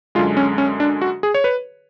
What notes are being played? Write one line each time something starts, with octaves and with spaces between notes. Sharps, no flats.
F#2 D3 G#3 F4
C#4
C#4
D4
F#4
G#4
C#5
B4